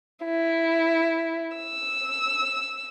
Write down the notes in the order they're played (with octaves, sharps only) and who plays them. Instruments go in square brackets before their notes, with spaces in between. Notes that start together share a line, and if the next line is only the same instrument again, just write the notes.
[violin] E4
E6